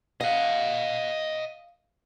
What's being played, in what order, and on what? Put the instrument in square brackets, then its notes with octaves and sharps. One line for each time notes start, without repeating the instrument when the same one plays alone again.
[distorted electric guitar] D#5 F#5 [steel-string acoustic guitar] F5